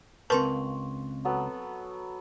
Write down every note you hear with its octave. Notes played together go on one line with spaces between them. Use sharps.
C#2 C4 A#4 B4 A5 C6 C#6
F#3 B3 A4